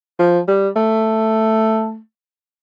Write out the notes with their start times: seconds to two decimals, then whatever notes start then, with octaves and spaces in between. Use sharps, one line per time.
0.19 F3
0.48 G3
0.76 A3